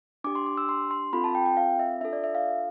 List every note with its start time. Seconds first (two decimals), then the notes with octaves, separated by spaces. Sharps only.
0.24 D4 G4 D6
0.35 C6
0.46 D6
0.57 E6
0.69 C6
0.91 C6
1.13 C4 F4 A4 B5
1.24 A5
1.35 G5
1.46 G5
1.57 F5
1.79 E5
2.01 D4 F4 A4 E5
2.13 D5
2.24 E5
2.35 F5